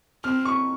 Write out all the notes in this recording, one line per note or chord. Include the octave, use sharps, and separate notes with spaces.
C4 F6
C#6